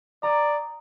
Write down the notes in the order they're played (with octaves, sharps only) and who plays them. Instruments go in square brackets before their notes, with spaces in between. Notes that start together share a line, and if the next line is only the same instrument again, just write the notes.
[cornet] D5 [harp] A#5 D#6